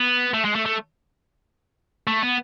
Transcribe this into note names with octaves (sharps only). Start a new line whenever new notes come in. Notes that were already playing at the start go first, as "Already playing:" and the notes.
Already playing: B3
A3
G#3
A3
A3
A3
B3